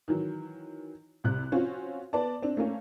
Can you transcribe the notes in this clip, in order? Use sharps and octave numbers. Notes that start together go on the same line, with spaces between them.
D#3 E3 F#3
C2 C3 F#6
F3 C4 C#4 F4 F#4 C5
B3 D5 A5
C4 D4
A3 A#3 C#4